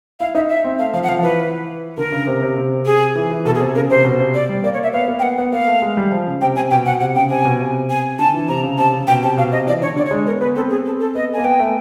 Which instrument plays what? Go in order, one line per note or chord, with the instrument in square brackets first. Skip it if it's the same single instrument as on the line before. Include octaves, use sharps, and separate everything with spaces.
[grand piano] E4 [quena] F5
[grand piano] D#4 [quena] E5
[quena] E5
[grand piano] C4
[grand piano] A3 [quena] F5
[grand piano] F3 [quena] F5
[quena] F#5
[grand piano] F3 [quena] F5
[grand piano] F3
[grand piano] E3 [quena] B4
[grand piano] D3 [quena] A#4
[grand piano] C#3
C3
C3
C3
[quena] G#4
[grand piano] E3
E3
[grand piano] B2 [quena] A4
[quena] G#4
[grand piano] C3
[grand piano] C#3 [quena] A#4
[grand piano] C3 [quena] C5
[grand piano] B2
C3
[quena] D5
[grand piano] G3
[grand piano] A#3 [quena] D5
[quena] C#5
E5
[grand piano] B3 [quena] F5
[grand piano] A#3
[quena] G5
[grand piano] B3 [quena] F#5
[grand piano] B3 [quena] F#5
[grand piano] A#3 [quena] F5
[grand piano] A3
G#3
G3
F3
C#3
[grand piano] C3 [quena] G5
[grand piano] C3 [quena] G#5
[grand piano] B2 [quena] G5
[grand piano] B2 [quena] F#5
[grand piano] C3 [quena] F#5
[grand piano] C#3 [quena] G5
[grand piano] C3 [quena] G#5
[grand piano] B2
C3
[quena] G#5
[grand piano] D3 [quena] A5
[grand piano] E3
[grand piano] C3 [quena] A#5
[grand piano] C#3
[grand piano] C3 [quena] A5
[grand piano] C#3
[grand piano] B2 [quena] G5
[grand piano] C3 [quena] A5
[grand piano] B2 [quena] F5
[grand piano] C3 [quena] D#5
[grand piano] E3 [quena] D5
[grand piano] D3 [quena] C#5
[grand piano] D3 [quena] D5
[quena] C#5
[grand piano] G#3
[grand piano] B3 [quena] A#4
[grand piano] B3 [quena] B4
[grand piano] C4 [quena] A4
[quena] G#4
A4
A4
[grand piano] B3 [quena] D#5
[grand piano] A#3 [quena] G#5
[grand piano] B3 [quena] G5
[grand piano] A3